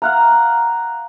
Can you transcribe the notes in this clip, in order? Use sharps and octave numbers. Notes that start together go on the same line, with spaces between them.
F5 F#5 A#5